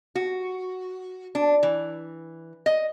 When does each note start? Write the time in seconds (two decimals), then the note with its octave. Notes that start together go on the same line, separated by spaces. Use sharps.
0.15 F#4
1.35 D4
1.63 E3
2.66 D#5